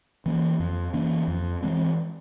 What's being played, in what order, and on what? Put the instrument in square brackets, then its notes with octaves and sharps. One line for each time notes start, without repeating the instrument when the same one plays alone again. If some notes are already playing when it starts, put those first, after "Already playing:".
[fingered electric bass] E3 A#3 C#4
F2
E3 A#3 C#4
F2
E3 G#3 C4